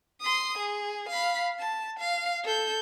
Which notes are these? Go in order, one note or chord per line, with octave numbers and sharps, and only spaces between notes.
C6 D#6
G#4
F5 B5
A5
F5
A4 G6